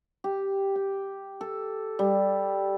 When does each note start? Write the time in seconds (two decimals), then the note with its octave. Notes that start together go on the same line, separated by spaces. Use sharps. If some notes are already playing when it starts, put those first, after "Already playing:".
0.24 G4
0.76 G5
1.41 A4
1.99 G3